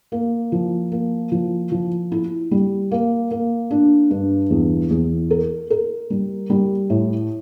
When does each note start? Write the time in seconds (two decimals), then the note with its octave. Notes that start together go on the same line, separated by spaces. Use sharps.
0.12 A#3
0.52 F3
0.92 A#3
1.32 F3
1.71 F3
2.12 E4
2.51 G3
2.91 A#3
3.31 A#3
3.71 D4
4.11 G2
4.51 E2
4.91 E2
5.31 A#4
5.70 A#4
6.10 G3
6.50 G3
6.90 A2